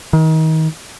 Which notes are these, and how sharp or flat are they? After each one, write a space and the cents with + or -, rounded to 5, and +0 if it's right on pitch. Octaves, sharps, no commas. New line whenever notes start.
D#3 +30